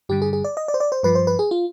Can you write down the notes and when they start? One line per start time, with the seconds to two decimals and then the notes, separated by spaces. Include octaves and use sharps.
0.09 G2 D3 G3 G4
0.22 G#4
0.33 G#4
0.44 D5
0.57 D#5
0.68 D5
0.74 C5
0.80 D5
0.92 C5
1.03 G2 F3 B4
1.15 C5
1.27 B4
1.39 G#4
1.51 F4